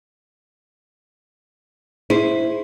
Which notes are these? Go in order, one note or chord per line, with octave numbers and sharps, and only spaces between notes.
E4 G#4 C5